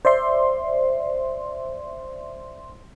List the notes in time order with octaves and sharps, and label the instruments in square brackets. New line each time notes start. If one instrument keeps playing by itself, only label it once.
[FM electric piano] C5 D5 E5 C6